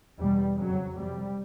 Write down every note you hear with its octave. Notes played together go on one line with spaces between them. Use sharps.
E2 B2 G3
F2 C#3 F#3
F2 C3 G3